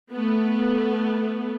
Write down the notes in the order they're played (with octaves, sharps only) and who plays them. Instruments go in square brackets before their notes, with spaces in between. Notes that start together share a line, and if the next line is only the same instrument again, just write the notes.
[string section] A3 B3